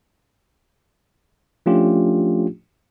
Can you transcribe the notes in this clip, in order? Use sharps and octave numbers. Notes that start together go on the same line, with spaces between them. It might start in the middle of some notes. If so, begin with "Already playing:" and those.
F3 A3 C#4 D4 F4 G4